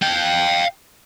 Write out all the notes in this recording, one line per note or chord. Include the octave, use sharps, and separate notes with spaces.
F5 G5